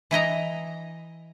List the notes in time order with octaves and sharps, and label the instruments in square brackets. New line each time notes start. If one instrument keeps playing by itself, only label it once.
[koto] E3 E4 D#5 A#5